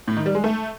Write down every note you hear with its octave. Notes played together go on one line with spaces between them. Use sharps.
A2
D#3
G3
G#3
A3